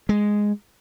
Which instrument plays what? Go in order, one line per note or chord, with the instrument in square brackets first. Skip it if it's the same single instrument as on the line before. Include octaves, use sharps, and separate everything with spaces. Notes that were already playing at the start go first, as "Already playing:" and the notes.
[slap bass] G#3